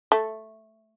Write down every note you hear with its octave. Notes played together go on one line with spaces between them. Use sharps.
A3